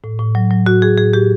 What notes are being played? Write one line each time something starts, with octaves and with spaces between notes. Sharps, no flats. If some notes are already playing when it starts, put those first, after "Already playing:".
A2
A2
F#3
F#3
A2 F#4
A2 G#4
A2 G#4
A2 G4